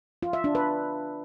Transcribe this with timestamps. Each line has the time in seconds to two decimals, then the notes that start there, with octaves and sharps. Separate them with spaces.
0.23 F4
0.33 E5
0.44 D4
0.55 B4